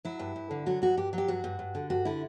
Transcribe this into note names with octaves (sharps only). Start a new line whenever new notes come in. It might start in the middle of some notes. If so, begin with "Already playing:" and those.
F#3 E4
G2
G2
D3
F#3 F#4
G2 F#4
G2 G4
F#3
G4
G2 F#4
G2
G2
D3
G2 F#4
D3 E4